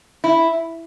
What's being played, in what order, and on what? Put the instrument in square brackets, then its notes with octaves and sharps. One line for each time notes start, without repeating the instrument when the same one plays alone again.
[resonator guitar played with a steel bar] E4